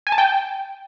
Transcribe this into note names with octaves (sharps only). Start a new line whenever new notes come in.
G#5
A5
G5